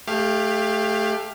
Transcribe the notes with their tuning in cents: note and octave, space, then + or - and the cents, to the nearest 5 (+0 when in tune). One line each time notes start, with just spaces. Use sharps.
A3 -15 G4 +20 F5 +0